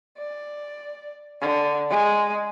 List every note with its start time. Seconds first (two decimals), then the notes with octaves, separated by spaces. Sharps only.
0.17 D5
1.41 D3
1.90 G#3